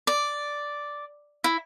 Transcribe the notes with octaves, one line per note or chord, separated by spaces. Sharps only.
D5
E4